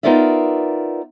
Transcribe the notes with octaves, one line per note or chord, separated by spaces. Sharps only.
B3 D#4 F4 A#4 D5 E5